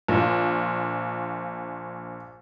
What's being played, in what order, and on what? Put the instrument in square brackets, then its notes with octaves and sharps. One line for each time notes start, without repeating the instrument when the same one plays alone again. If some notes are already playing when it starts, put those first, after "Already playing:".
[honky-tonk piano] A#1 F4